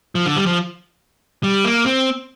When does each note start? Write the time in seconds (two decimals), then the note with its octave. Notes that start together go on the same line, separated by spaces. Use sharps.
0.15 F3
0.26 D3
0.36 G3
0.46 F3
1.43 G3
1.64 A#3
1.86 C4